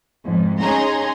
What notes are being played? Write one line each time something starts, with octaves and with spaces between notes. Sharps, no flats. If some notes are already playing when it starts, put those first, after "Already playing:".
F2 G#2
C#4 D#4 G#4 A#5 C6